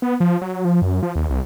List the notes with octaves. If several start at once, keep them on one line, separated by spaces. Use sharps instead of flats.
B3
F3
F#3
F3
F#2
F3
D#2
C2